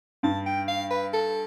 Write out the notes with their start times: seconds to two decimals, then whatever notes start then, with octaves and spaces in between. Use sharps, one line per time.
0.23 G2 A5
0.46 G5
0.68 F5
0.91 B4
1.13 A4